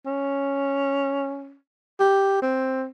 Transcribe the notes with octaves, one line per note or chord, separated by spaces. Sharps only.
C#4
G4
C4